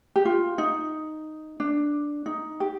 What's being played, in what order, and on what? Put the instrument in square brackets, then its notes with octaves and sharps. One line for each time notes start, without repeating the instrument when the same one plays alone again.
[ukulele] G4
F4
D#4
D4
D#4
G4